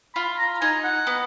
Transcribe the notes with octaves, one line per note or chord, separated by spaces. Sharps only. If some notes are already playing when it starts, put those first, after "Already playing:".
F4 B5
A#5
D#4 G#5
F#5
B3